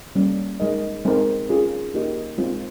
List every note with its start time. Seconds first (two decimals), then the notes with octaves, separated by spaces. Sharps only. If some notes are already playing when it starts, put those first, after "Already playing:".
0.16 G3 A#3 C#4
0.60 G#3 D#4 A#4 D#5
1.05 G#3 C4 D#4 A#4
1.49 C#4 F4 G#4
1.94 A#3 D#4 G4 A#4 D#5
2.38 G#3 C4 F4